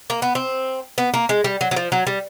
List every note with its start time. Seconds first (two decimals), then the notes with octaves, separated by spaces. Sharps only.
0.10 A#3
0.22 B3
0.35 C4
0.98 B3
1.14 A#3
1.29 G#3
1.44 G3
1.61 F#3
1.71 F#3
1.76 F3
1.92 F#3
2.07 G3